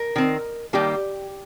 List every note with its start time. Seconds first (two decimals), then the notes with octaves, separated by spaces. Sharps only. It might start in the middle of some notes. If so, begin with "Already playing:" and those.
Already playing: A#4
0.16 D#3 C4
0.73 D#3 G3 A#3 G4